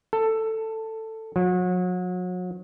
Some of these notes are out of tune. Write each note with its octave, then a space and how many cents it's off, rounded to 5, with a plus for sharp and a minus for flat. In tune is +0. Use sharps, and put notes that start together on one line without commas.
A4 +10
F#3 -35